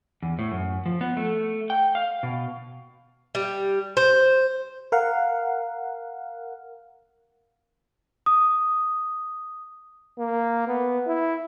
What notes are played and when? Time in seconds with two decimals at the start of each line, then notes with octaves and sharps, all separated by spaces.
0.23 E2
0.39 A2
0.51 F#2
0.86 F3
1.01 B3
1.17 A3
1.70 G5
1.95 F5
2.23 B2
3.35 G3
3.97 C5
4.92 A#4 F5 F#5
8.26 D#6
10.19 A#3
10.68 B3
11.07 E4